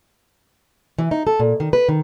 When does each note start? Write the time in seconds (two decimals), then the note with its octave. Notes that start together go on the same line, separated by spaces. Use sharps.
0.98 E3
1.11 D#4
1.27 A4
1.40 A#2
1.60 D#3
1.73 B4
1.89 D#3